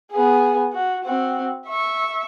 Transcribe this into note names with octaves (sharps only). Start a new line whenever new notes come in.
B3 G#4
F#4
C4 F#4
E5 C#6